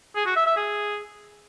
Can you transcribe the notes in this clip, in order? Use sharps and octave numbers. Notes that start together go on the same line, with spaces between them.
G#4
F#4
E5
E5
G#4